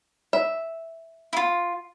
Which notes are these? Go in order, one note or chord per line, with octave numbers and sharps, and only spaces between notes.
E5
E4 F4